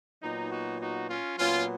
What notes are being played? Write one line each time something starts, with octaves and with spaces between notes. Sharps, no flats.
A#2 F#3 B3 D#4
D#4 F#4
D#4 F#4
C#4 F4
A#2 F#3 B3 C#4 F4